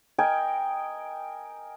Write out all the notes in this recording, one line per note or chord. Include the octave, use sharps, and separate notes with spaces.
A#4 D#5 G5 G#5